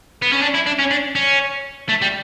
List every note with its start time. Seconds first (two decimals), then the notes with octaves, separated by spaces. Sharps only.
0.22 B3
0.32 C#4
0.42 D4
0.54 E4
0.66 D4
0.79 C#4
0.91 D4
1.15 C#4
1.89 A3
2.02 G3